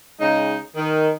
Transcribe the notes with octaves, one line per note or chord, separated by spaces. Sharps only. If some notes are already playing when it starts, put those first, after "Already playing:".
C#3 G#3 D#4
D#3